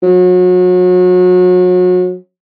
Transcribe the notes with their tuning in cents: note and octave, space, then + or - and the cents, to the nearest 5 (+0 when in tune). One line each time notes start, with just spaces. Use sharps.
F#3 -35